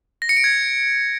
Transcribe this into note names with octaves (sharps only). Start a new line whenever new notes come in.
A#6
C#7
D7
G#6